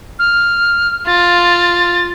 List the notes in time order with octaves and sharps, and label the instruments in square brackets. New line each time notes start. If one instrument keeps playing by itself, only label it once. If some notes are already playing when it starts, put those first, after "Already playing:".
[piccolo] F6
[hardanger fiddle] F4 [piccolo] A6